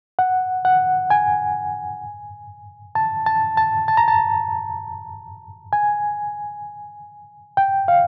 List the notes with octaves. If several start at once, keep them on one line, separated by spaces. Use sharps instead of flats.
F#5
F#5
G#5
A5
A5
A5
A5
A#5
A5
G#5
G5
F5